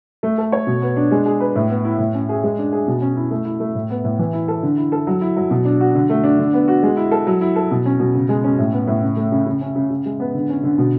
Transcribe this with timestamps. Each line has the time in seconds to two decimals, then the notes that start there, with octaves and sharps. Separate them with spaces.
0.23 A3
0.38 A4
0.52 C#5
0.67 B2
0.82 B3
0.96 D4
1.11 G#3
1.26 G#4
1.40 B4
1.56 A2
1.70 B3
1.85 E4
1.99 A2
2.14 C#4
2.29 G#4
2.43 G#3
2.58 D4
2.72 G#4
2.87 B2
3.02 C#4
3.17 E4
3.31 A3
3.45 E4
3.60 A3
3.75 A2
3.90 B3
4.04 A2
4.19 E3
4.33 E4
4.48 A4
4.63 D3
4.78 E4
4.92 A4
5.07 F#3
5.21 E4
5.37 F#3
5.50 B2
5.65 D4
5.81 F#4
5.95 D3
6.10 A3
6.24 D4
6.39 D3
6.53 B3
6.68 F#4
6.83 G#3
6.97 E4
7.11 A4
7.27 F#3
7.41 E4
7.56 A4
7.71 B2
7.85 C#4
7.99 B2
8.15 C#3
8.29 G#3
8.44 C#4
8.58 A2
8.73 B3
8.87 A2
9.03 C#3
9.17 A3
9.32 C#3
9.46 C#3
9.61 C#4
9.75 C#3
9.90 C#3
10.06 G#3
10.20 B3
10.34 D3
10.49 C#4
10.63 D3
10.78 B2